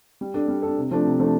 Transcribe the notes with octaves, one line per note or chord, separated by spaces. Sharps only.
G3
D4 A4
G3
D4 A4
C3
F3 A3 D4
C3
F3 A3 D4